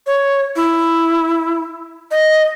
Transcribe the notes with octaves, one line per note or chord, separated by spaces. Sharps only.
C#5
E4
D#5